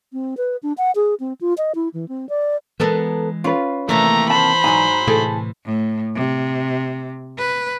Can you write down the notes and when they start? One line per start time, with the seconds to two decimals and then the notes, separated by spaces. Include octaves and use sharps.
0.13 C4
0.37 B4
0.63 D4
0.78 F#5
0.95 G#4
1.20 C4
1.41 F4
1.58 D#5
1.75 E4
1.94 E3
2.09 C4
2.29 D5
2.80 E3 G#3 B3 A4 A#4
3.44 C#4 F4 B4
3.89 C3 D#3 E3 A3 A#3 A#5
4.30 C5 A5 B5
4.64 G#2 F#3 D#4 G#5 A#5
5.07 A2 C3 E3 E4 G#4 A4
5.65 A2
6.15 C3
7.39 B4